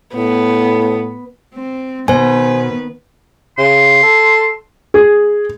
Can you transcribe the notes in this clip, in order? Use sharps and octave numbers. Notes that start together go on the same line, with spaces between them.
A2 B3
C4
B2 D#3 B3 B4 C5 G#5
C#3 C6
A4
G#4